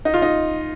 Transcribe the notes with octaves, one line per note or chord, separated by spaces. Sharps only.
D#4
F4
D#4